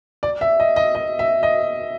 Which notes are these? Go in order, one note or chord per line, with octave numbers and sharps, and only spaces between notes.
D5
E5
D#5
D#5
D#5
E5
D#5